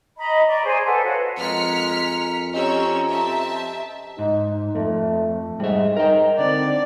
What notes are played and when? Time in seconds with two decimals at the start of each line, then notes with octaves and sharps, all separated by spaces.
0.17 D#5 A#5 B5
0.47 D5 A#5 C#6
0.64 G#4 C5 G#5
0.85 A4 B4 F#5
1.04 F#4 C#5 F5 F#5
1.38 F2 G#3 A#4 F6 B6 C#7
2.54 C4 C#4 G4 C#5 D#5 A#5 E6
3.09 E5 A5
4.19 G#2 D#4
4.75 F2 A3
5.60 G#2 G3 E5
5.96 D#4 A#4 G5
6.39 D3 C4 D5